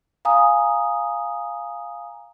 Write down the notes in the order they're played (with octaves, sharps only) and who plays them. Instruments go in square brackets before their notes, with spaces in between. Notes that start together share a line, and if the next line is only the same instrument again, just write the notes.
[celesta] F5 G#5 A#5 D#6